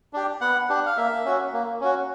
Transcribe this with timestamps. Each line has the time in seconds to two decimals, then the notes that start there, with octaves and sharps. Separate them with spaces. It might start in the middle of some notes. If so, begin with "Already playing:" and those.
0.13 D4 G4
0.41 B3 F#5
0.70 D4 G4
0.86 F5
0.97 A#3 E5
1.25 C#4 F#4
1.53 A#3
1.81 C#4 F#4